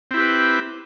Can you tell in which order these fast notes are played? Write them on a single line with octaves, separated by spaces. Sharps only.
C4 E4 G4 B4